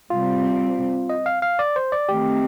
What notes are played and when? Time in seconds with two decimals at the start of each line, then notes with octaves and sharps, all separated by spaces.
0.10 C3 G3 C4 F4
1.10 D#5
1.26 F5
1.42 F5
1.59 D5
1.76 C5
1.92 D5
2.09 D#3 A3 C4 G4